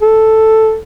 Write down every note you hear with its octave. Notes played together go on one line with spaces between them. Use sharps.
A4